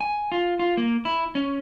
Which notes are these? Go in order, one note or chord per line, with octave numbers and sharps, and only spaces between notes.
G#5
F4
F4
A#3
E4
C#4